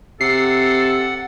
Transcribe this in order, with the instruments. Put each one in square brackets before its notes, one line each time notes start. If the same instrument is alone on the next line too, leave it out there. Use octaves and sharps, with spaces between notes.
[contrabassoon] C3 [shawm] A4 [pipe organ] F#5 [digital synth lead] C7